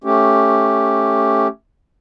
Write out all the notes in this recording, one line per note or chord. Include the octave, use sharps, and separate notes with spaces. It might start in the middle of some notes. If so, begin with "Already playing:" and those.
A3 C#4 G4